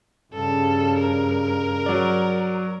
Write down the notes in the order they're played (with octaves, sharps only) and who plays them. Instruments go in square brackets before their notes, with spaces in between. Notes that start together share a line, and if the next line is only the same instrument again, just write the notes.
[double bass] G2 C#3 [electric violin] A4
[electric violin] A#4
[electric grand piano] F#3 D5